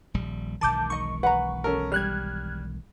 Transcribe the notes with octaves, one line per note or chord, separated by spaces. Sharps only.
D#1 A#1 G3
E1 B1 D#3 A5 D6 G6
D#4 D#5 C#6
B4 F#5 A#5
C#4 A4 A#4
G3 F6 F#6 G#6